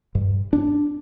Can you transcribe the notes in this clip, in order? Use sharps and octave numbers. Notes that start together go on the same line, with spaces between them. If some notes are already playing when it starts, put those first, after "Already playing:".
G2
D4